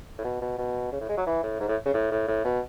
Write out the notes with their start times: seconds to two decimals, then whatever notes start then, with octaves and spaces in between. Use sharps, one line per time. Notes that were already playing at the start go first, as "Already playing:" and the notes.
0.18 A2
0.25 B2
0.42 B2
0.58 B2
0.92 C#3
1.01 A2
1.09 G#3
1.18 F#3
1.26 E3
1.43 A2
1.60 G#2
1.68 A2
1.86 C#3
1.94 A2
2.11 A2
2.28 A2
2.45 B2